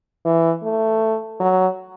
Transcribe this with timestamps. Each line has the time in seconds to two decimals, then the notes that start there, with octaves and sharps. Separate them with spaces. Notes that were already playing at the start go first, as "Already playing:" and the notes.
0.25 E3
0.63 A3
1.40 F#3